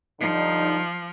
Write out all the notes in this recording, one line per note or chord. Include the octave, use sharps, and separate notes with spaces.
D3 F3 G3 D#4